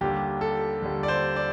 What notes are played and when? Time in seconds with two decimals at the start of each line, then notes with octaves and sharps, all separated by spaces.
0.01 D#2 D3 G3 G4
0.41 A4
0.82 D#2 D3 G3
1.03 D5
1.08 C5
1.36 D5